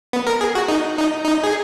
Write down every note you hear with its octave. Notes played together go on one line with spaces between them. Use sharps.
B3
A#4
G#4
F#4
D#4
D#4
D#4
G#4